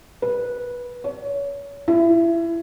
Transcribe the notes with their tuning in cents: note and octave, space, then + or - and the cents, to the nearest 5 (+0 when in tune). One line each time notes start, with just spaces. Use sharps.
B4 -15
C#5 +30
E4 +25